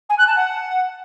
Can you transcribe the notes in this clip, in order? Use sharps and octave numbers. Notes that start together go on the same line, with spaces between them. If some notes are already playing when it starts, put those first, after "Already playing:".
G#5
F#6
A5
F#5